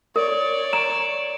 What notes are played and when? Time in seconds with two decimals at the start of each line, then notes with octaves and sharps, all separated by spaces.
0.16 A#4 C#5 D5
0.73 A#5 D7 E7